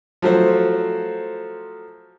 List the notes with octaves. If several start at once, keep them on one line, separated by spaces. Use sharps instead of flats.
F3 F#3 A3 C5